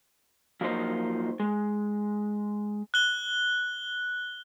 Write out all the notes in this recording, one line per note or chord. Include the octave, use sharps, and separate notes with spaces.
F3 F#3 A#3 D#4 C5 D#5
G#3
F#6 G7